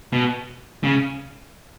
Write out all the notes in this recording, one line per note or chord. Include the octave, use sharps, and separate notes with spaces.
B2
C#3